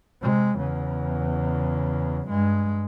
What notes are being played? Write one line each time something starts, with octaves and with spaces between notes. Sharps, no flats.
C3 G#3
E2 C#3
G2 G#3